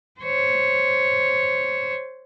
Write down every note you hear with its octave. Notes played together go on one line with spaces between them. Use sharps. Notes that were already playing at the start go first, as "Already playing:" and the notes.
C5 C#5